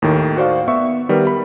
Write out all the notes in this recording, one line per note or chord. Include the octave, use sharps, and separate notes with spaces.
D#2 A2 D#3
F#4 C5 D5 F5
B3 E5 C#6
D#3 G3 B3 A#4 B4
B5